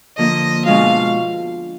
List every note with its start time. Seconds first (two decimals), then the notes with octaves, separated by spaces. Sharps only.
0.17 D3 F3 A#3 D#5
0.65 B2 G#3 D4 F4 F5